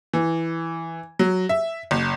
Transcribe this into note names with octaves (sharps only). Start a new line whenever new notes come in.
E3
F#3
E5
F#1